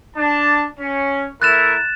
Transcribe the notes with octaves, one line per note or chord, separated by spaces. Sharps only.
D4 A5
C#4
A3 E4 A#4 F#6 A6 E7